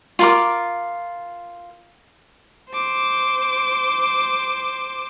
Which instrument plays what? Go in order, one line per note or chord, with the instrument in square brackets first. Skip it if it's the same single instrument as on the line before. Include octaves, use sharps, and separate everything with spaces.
[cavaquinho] F4 A#4 D6
[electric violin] C5 D6